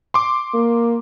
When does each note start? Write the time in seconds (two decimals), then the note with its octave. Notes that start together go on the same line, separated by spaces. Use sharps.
0.14 C6 D6
0.54 A#3